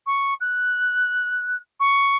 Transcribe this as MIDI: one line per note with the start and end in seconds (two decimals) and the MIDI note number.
0.07 0.34 85
0.41 1.56 90
1.80 2.17 85